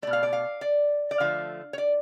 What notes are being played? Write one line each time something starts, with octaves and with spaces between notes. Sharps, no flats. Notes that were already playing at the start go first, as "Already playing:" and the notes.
B2 A3 D5
F5
D5
F5
D5
D5
D3 F3 A3 F5
C#5
D5